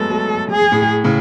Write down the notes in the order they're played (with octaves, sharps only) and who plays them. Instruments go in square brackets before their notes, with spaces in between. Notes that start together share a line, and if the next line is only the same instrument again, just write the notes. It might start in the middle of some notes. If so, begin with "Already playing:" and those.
Already playing: [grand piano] F#3 G#3 A3 B3 [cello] A4
[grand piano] F#3 A3
[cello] G#4
[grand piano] A2
A2 C#3